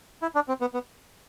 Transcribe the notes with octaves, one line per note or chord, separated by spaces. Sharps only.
E4
D4
C4
B3
B3